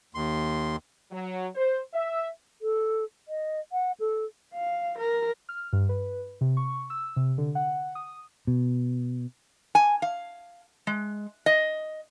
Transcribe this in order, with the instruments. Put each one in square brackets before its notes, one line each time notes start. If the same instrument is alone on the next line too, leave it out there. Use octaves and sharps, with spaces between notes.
[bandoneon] D#2 C6
[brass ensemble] F#3
C5
E5
[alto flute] A4
D#5
F#5
A4
[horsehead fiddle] F5
A#4
[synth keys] F6
G2
B4
C3
C#6
E6
C3
D3
F#5
D#6
[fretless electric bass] B2
[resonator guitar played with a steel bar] G#5
F5
G#3
D#5